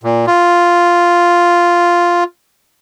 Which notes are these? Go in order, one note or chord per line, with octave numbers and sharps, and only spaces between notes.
A#2
F4